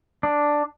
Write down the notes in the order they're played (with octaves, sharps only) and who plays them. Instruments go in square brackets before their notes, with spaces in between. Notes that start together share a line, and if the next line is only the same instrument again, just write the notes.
[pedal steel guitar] D4